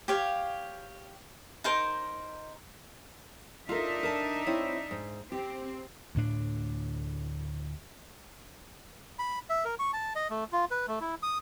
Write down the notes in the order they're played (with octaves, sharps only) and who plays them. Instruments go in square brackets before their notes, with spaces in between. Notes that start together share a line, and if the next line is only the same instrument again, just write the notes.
[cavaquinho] G4 C#5 F5
D#4 A#4 C5
[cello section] D4 D#4 E5 [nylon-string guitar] F4 A4 A#4
[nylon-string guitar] A#4 A5
C4 E4 C#5
G#2
[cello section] C4 [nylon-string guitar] G4
[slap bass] D2 A2 D4
[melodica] B5
E5
A#4
C#6
A5
D#5
A3
F4
B4
A3
E4
D#6